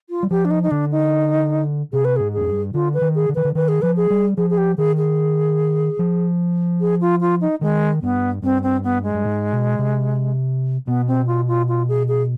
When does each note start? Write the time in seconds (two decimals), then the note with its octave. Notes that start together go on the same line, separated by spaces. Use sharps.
0.10 F4
0.23 G3
0.31 F3 G4
0.45 D4
0.51 D#4
0.63 D#4
0.71 D3 D4
0.92 D#4
1.93 C3 G#4
2.05 B4
2.16 G#2 G#4
2.33 F2 G#4
2.47 G2
2.74 D3 F4
2.94 B4
3.01 D#3
3.15 G#4
3.29 D3
3.35 D#3 B4
3.45 D3
3.55 D#3 B4
3.68 G#4
3.82 F3 B4
3.97 G#4
4.10 G3
4.37 F3 G#4
4.50 G#4
4.58 G4
4.78 D#3 G#4
4.98 G#4
5.99 F3
6.81 G#4
7.01 F4
7.21 F4
7.41 D#4
7.61 D#3 G#3
8.02 G2 B3
8.42 G2 C4
8.63 C4
8.84 B3
9.03 G#3
9.14 G2
9.25 G#2
9.52 B2
9.79 C3
10.87 B2 B3
11.08 C4
11.27 F4
11.48 F4
11.69 F4
11.89 G#4
12.08 G#4